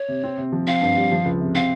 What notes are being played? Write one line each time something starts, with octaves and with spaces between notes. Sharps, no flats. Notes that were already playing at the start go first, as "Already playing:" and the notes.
Already playing: C#5
C3
C4
C3
F3
C4 F5
G2
G3
F3
C#2
C3
C4 F5